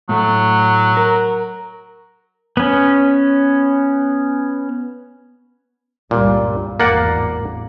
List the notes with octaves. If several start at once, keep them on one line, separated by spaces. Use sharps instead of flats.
A2 F#3 A3
A#4
B3 C#4
C#2 G2 A#2 G3
G#1 E2 A2 A#3 D5 F#5